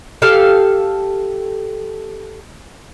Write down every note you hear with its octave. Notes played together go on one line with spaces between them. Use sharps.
G4 A4 F5